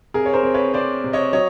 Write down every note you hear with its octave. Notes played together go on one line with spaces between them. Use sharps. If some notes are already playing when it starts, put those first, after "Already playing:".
C3 G#4 A#4
C#5
A#4 C5
C4
B4 C#5
C4 C5 D5
C3
C#5 D#5
F#3 C#5 D#5